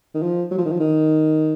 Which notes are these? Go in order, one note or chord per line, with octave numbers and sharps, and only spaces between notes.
D#3
F3
F#3
F3
D#3
F3
D#3